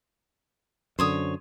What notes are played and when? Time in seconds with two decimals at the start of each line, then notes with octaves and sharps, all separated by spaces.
0.99 F#2 D3 C5 C#5 D#6